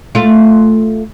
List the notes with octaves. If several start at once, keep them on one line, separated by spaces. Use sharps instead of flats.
A3 F4